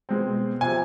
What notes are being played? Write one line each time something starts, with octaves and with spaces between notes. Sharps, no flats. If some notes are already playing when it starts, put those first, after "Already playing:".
B2 G#3 C4
C3 F3 G#5